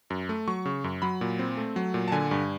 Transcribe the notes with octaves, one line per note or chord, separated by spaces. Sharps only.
F#2
A3
F#3 C#6
C#3
F#2
F#3 B5
A#2
C4
A3
F#3
A#2
A5
D3 G#5
G2